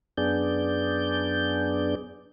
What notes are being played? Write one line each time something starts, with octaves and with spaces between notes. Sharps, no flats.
F#2 B3 D4 G#4 D5 G6